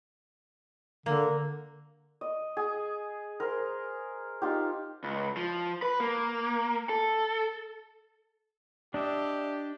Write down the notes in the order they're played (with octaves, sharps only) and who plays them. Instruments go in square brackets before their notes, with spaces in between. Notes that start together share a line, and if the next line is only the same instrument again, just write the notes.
[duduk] D3 [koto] A#3
[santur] D#5
G#4
A#4 C5
D#4 F4 G4
[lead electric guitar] C#2
F3
B4
A#3
A4
[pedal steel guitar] D4 D#5 E5 [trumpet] G4